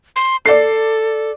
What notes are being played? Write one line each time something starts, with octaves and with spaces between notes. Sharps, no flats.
C6
A4 D5 C7